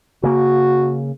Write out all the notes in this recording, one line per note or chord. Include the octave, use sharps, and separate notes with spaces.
C#3 A#3 F#4